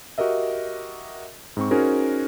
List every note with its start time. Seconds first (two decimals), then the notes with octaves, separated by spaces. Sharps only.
0.18 F#4 G4 A#4 D#5 E5
1.57 G#2 C4 C#6
1.71 C#4 D#4 F#4 G#4 A#4 C5